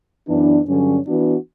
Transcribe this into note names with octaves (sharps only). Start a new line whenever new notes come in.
F#2 E3 B3 D4
G2 D3 F#3 C#4
E3 B3 D4 F#4